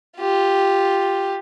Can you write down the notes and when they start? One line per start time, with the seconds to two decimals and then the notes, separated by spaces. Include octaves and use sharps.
0.17 F4 G4